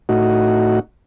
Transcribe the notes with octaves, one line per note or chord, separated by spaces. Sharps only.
A2 D#4 F#4